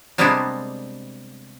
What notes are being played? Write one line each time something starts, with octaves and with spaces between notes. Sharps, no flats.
C3 G3 G#3 A#3 B3 D4